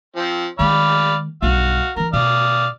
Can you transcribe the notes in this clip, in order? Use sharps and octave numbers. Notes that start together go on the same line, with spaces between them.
F3 C4
D#3 G#3 D5 F5 B5
B1 G2 F#4 F5
E3 C#4 A#4
B2 D5 F5 D#6